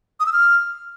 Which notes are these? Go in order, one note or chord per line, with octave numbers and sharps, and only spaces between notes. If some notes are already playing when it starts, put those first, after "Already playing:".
D#6
E6
F6